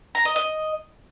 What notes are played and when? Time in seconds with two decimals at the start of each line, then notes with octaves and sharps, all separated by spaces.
0.15 A#5
0.25 D#5
0.36 D#5